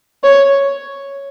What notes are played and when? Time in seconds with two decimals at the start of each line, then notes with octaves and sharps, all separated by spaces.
0.24 C#5